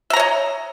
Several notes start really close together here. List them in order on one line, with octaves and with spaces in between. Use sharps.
E5 A#5 C#5 D#5